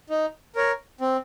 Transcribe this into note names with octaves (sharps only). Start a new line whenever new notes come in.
D#4
A#4 C#5
C4